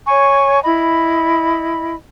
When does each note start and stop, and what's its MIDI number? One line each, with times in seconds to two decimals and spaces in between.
0.07 0.59 73
0.07 0.59 80
0.07 0.59 85
0.63 1.93 64
0.63 1.93 75
0.63 1.93 83